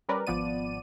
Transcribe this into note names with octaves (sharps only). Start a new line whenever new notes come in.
G3 C#4 A#4 B4 D5
G#1 F3 B3 D5 D#7